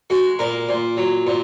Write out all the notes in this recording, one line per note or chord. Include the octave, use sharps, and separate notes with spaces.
G#3 F#4
A#2 A#4
A#2
F#3
A#2